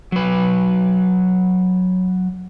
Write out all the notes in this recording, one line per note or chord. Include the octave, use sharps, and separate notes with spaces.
F#3 B4